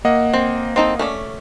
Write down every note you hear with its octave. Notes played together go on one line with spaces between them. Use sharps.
A#3 D#5 F#5
C4
C4 D#4 A4
A3 C#4 D5